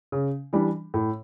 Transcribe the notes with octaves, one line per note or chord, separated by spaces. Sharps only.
C#3
E3 G3 D4
A2